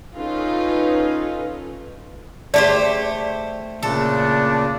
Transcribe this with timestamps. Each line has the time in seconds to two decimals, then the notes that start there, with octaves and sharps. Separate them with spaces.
0.16 C#4 D#4 F4 A4 B4
2.54 A3 G4 G#4 C5 D5
3.82 A#2 C#3 D4 A4